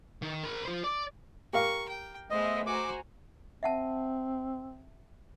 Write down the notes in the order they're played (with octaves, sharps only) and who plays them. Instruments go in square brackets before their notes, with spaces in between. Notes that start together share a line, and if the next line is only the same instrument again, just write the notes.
[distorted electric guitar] D#3
A#4 B5
F4 C5
D5
[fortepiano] G4 A#4 F5 [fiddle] C#6
[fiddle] G5
[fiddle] G#3 C5 [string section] A3 B3 E5 [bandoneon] D#5
[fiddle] F#4 C5 [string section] G#5 A#5 [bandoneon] D6
[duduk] C4 [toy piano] E5 F#5 A5